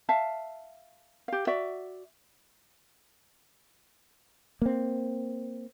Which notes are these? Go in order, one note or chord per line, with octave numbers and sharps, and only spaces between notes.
E5 F5 A5
G4 F5
F#4 D5 E5
A#3 C4